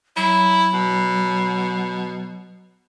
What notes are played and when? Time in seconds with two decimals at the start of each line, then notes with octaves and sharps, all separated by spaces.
0.17 F#3 E4
0.74 B2